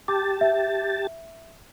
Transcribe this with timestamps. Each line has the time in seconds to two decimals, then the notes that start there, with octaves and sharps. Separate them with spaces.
0.08 G4 A5 D6
0.41 E5